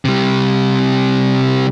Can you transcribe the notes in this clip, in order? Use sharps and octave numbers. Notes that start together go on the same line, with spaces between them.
C3 G3